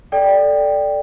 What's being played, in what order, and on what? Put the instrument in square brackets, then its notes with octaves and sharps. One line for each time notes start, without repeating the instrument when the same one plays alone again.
[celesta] A4 D5 G5